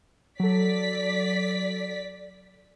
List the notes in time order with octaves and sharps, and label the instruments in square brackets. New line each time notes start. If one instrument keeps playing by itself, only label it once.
[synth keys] F#3 A4 [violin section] D5 B6